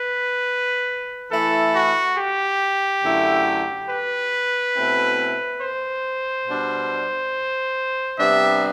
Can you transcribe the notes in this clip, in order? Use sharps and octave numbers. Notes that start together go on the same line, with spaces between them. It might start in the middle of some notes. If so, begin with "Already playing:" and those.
Already playing: B4
E3 A3 E4 A4
F#4
G4
F#2 D3 A3 E4
B4
B2 A3 C4 E4
C5
B2 G3 D4
C3 G3 B3 D4 E5